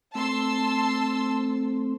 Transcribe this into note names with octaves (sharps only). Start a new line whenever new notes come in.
A3 C4 A5 C6 E6